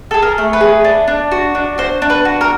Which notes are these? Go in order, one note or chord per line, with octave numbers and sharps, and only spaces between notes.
G#4 A4
A#4
A3
B4
G#4
D4
D4
F#4
D4
F#4 C5
D4
B4
F#4
A#4